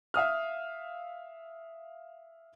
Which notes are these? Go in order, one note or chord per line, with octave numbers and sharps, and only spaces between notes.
E5 F5 D#6 F6